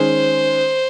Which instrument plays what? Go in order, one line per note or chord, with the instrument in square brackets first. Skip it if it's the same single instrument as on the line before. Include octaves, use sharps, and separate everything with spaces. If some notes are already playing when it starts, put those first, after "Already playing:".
Already playing: [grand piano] D#3 G#3 C#4 [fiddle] C5